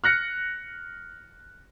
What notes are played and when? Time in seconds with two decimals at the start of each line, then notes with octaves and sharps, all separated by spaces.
0.04 F6 F#6 A#6 C#7